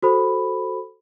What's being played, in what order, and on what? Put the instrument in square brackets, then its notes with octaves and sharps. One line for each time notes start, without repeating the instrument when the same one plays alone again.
[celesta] F#4 A4 C5 B5